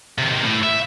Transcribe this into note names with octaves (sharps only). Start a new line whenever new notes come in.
C3 D#3
A2
E5